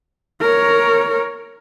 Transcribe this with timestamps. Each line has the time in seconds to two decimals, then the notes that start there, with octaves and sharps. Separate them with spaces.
0.41 A#4 C#5